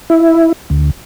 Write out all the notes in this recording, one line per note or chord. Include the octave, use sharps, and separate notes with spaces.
E4
D2